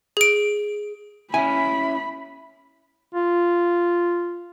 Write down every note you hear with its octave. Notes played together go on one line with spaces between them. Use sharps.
G#4 D7
C#4 E4 E5 G#5 B5
F4